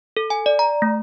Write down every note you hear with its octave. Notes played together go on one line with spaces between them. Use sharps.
A4
G#5
D5
A#5
A3